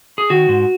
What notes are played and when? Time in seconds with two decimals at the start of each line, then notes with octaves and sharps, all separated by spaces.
0.18 G#4
0.30 D#3 F#4
0.49 G#2